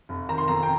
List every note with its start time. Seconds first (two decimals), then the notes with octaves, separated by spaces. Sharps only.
0.09 F1
0.29 D#3 A#5
0.38 C6
0.48 F2 A#5
0.63 G5